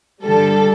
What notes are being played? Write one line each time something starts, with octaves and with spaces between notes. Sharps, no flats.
G2 D3 G3 A4